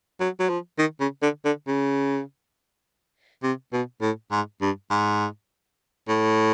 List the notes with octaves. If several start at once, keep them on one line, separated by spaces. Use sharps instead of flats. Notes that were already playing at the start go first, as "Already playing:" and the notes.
F#3
F#3
F3
D#3
C#3
D3
D3
C#3
C3
B2
A2
G#2
G2
G#2
A2